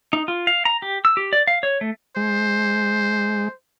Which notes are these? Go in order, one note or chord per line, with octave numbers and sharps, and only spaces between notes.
D#4
F4
F5
A#5
G4
E6
G4
D5
F5
C#5
A3
G#3 C5